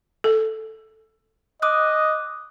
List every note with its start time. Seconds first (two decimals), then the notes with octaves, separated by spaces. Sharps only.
0.24 A4
1.62 D#5 D6 D#6 F#6